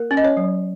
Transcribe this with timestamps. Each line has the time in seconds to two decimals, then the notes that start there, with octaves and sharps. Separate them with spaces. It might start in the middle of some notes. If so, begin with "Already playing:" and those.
Already playing: A#3 A#4
0.11 C#4
0.17 D#5
0.24 C#4 C#5
0.37 F#3